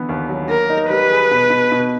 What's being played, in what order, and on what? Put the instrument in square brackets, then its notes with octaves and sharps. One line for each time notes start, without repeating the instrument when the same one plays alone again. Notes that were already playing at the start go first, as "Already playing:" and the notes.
Already playing: [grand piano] D3 E3 B3
D#2
F#3
[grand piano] A#3 [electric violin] A#4
[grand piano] D#4
[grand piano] G3 [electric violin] B4
[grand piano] G#4
B2
B2
B2